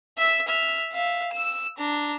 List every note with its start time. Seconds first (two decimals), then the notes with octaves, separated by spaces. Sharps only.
0.18 E5 E6
0.48 E5 F6
0.93 E5 F5
1.34 E6 E7
1.78 D4 A#5